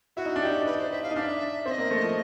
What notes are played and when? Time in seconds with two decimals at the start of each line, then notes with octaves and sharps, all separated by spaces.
0.17 E4 F#4
0.25 D#4
0.36 D4
0.41 D#4 G4
0.66 B4
0.78 C5
0.91 E5
1.03 F5
1.11 D#4
1.16 D4 F5
1.20 E5
1.66 C4 E5
1.71 D#5
1.78 A#3
1.91 A3
2.03 F3